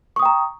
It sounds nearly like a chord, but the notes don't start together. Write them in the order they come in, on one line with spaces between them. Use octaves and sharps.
C#6 D#6 G5 A#5